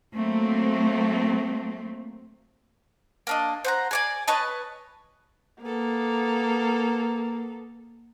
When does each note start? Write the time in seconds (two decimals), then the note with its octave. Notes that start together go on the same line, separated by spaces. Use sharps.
0.17 F#3 A3 A#3 C4
3.27 A#3 D4 D#5
3.64 C5 F#5 A#5
3.91 G#4 D5 G#5
4.28 B4 C#5 D#5 A5
5.62 A#3 B3 A4